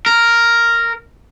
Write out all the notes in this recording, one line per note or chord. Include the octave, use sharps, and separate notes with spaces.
A#4